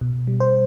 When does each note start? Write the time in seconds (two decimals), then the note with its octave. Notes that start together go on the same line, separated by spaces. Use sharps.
0.01 B2
0.27 G3
0.40 C5